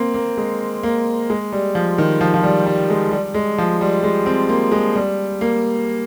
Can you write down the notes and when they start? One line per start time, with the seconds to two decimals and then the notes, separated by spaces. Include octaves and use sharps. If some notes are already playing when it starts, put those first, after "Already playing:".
Already playing: A#3 C4
0.14 A#3
0.37 G#3
0.83 A#3
1.30 G#3
1.52 G3
1.75 F3
1.98 D#3
2.21 F3
2.34 F3
2.43 G3
2.66 G3
2.90 G#3
3.12 G3
3.34 G#3
3.58 F3
3.81 G3
4.03 G#3
4.26 C4
4.49 A#3
4.72 G#3
4.95 G3
5.41 A#3